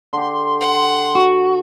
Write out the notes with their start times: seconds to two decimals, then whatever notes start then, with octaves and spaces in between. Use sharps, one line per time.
0.13 D3 G4 C6
0.61 F#5
1.15 F#4